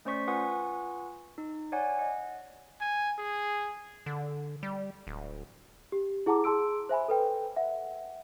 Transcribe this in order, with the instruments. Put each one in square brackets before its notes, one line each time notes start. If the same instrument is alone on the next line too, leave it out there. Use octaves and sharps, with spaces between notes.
[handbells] A3 C#4 C5 D5 C#6 B6
F4 B4 F#5 G#5 C#6 D#6
D#4
C#5 D5 F#5 G#5
D#5 F#5
[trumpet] G#5
G#4
[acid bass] D3
G3
D1
[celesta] G4
E4 G#4 F#5 A5 A#5 D6
G#4 A5 C6 E6 D7
C5 E5 G#5 B5
A4 B4 G5
E5 F#5